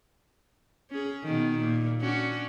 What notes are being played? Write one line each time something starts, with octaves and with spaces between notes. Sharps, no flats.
C#4 G#4
B2 D#3
A#2
C#4 D4 F#4